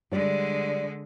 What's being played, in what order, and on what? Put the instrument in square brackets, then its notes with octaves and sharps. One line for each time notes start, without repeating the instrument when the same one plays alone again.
[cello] D3 G#3 [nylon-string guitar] G3 D5